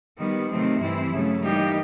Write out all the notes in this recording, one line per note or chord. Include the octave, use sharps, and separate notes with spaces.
D#3 G3 B3
C3 D#3 F#3 A3 C4
G2 E3 G3 C4 E4
C#3 F#3 A3
E3 G3 A#3 D#4 G4